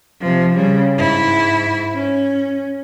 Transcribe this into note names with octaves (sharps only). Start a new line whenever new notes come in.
C3 F3
C#3 G3
G#2 E4
C#4